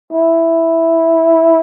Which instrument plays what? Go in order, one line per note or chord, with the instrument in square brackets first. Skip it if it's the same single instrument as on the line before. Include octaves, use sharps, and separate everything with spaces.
[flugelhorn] E4